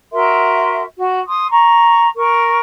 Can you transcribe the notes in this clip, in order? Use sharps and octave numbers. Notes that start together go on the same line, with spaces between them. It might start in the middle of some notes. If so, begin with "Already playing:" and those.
F#4 A#4 E5 C6
F#4
C6 D#6
A#5 C#6
A#4 C#6